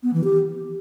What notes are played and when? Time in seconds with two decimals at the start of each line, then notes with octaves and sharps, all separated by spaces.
0.03 B3
0.14 E3
0.24 G4